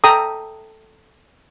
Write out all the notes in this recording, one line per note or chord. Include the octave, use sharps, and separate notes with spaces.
A4 G5 A#5 D#6